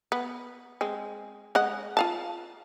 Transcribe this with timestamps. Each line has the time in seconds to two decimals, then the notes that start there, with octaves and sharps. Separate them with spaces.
0.12 B3
0.81 G#3 C4
1.55 G#3 D#5 F#5
1.97 F4 F5 A5